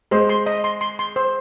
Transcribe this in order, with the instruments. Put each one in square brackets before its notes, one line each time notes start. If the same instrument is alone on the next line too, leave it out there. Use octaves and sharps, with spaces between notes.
[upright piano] G#3 [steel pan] C5
[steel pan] C6
D#5
C6
C6
C6
C5